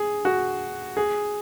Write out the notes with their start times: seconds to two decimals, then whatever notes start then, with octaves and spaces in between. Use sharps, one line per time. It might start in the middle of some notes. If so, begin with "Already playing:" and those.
Already playing: G#4
0.25 F#4
0.97 G#4